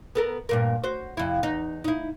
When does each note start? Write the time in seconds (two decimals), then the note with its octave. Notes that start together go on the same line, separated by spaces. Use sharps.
0.15 B3 A4 A#4
0.49 G2 A#2 A#4
0.84 F#4 C5
1.17 F2 C3 E4
1.43 E2 D#4
1.84 D#4 E4